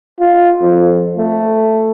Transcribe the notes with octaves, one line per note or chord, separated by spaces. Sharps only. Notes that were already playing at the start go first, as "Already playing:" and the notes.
F4
F2
A3